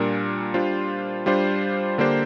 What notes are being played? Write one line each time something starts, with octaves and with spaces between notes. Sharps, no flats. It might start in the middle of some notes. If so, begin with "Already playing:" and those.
Already playing: A#2 G3 D4 A#4
G3 D4 F4 C5
G3 D4 F4 C5
D3 A#3 D4 G4 C5